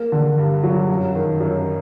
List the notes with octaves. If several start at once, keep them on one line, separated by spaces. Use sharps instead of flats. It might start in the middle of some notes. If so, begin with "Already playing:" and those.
Already playing: A#3
D3
G2
F#3
F#2
D#3
F#2